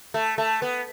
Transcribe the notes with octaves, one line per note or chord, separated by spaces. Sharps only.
A3
A3
B3